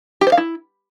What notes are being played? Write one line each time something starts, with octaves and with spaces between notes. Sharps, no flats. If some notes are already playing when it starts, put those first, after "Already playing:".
G4
C5
F5
E4